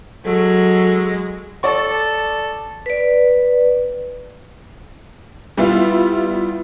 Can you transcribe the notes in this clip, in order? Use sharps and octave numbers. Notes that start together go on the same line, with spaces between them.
F#3 G#3 A4
A4 D5 C#6
B4 D5
G3 B3 E4 F4